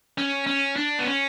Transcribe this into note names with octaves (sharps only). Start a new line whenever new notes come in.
C#4
C#4
D4
B3
C#4